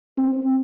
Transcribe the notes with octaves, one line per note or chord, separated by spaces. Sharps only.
C4